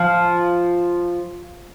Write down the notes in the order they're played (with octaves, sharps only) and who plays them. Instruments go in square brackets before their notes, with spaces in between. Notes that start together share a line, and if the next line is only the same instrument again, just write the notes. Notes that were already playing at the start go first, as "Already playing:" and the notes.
Already playing: [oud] F3